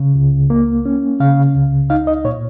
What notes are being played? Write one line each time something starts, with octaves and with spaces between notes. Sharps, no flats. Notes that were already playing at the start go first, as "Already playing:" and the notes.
Already playing: C#3
C#2
A#3
C#4
C#3 F5
C#2
D#4 F5
D#5
A#2 C#5